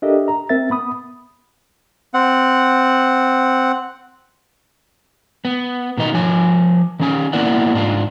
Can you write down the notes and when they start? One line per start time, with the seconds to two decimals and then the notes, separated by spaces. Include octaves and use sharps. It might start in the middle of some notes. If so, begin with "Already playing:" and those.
0.02 D4 G4 A4 A#4 D#5 E5
0.28 A#5
0.49 C4 A#4 E5 A6
0.70 B3 B5 D#6
2.14 C4 F#5
5.45 B3
5.98 B2 D#3 B3 D#4
6.14 F3 C#5 G#5
7.00 D#3 C#4 G#5
7.33 A#3 B3 E4 A#4 D5 F#5
7.73 G#2 D4 F4